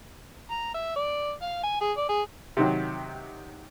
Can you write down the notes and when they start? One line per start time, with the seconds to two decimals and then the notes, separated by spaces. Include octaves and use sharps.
0.51 A#5
0.74 E5
0.96 D5
1.42 F5
1.63 G#5
1.81 G#4
1.97 D5
2.09 G#4
2.57 C3 D#3 F#3